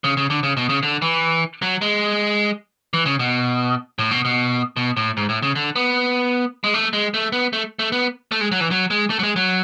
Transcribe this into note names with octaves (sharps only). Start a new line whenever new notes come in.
C#3
C#3
D3
C#3
B2
C#3
D3
E3
F#3
G#3
E3
C#3
B2
A2
B2
B2
B2
A2
G#2
A2
C#3
D3
B3
G#3
A3
G#3
A3
B3
A3
A3
B3
A3
G#3
F#3
E3
F#3
G#3
A3
F#3
G#3
F#3